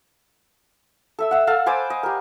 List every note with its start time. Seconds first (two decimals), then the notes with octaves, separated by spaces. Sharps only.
1.19 A4 E5 E6
1.31 E5 F#5
1.47 A4 F5 F#5
1.66 C5 G#5 B5 D6
1.90 D#5
2.03 G4 A#4